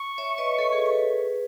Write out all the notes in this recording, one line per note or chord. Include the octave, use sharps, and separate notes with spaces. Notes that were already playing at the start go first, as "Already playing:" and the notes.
Already playing: C#6
C#5 E5
B4 D#5
A4 C#5
G#4 B4
G#4 B4